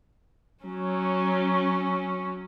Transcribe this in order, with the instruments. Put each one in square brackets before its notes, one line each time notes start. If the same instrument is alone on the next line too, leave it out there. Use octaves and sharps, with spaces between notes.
[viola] F#3 C#4